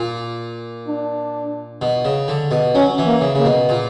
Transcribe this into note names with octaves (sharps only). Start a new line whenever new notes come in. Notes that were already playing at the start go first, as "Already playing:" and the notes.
Already playing: A#2
D4
B2
C#3
D3
B2
F#3 C#4
E3
A#3
C#3
C#3 A#3
B2
A#2